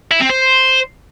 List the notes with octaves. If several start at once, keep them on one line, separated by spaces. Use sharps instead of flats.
E4
C4
C5